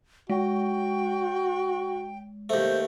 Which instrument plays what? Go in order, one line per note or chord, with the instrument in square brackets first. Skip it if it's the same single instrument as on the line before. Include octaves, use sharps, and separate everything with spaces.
[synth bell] G#3 [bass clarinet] F#4 [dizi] G5
[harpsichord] D#2 A3 [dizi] C5